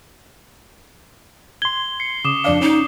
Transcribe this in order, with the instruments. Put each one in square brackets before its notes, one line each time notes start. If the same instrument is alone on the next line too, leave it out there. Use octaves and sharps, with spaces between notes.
[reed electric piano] C6 G#6 [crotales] G7
[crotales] C7 C#7
[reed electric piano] C#3 [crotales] D6 D#6 E7
[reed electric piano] F2 D5 F5 [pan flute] D4
[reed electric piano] C#4 [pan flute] D#4